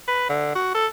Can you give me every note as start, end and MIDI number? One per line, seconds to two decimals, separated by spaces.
0.08 0.29 71
0.29 0.53 50
0.56 0.71 66
0.75 0.87 69